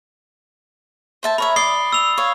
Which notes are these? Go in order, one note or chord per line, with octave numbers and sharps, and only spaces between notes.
C5 E5 A5
A#4 C#5 E5 B5
D5 D#6 C7 G7
E6 F7
C#5 F5